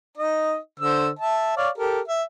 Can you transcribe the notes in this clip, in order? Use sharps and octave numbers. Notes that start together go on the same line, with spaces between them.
D#4 D#5
D3 C5 E6
E5 A5
C#5 D5 F5
G4 A4 A#4
E5